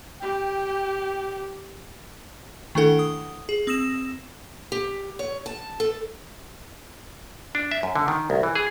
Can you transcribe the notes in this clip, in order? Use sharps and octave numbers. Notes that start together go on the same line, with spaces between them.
G4 G5
D#3 A3 D4 E4 A4 F#5
D#6
G#4
C4 D#6 E6 A#6 E7
G4
C#5
A5
A4
D4
E5
F#2
D3
D#3
C2
E3
G#4